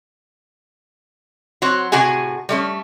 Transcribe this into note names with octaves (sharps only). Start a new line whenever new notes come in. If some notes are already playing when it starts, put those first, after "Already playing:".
F#3 C4 F#4
A2 C3 F#4 G#4 G#5
G3 A3 C#4